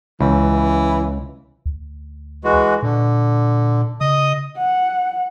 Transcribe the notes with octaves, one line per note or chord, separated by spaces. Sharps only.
C#2 E3
D2
E3 G#3 F#4
A#2 D3
C#3 D#5 D#6
F#5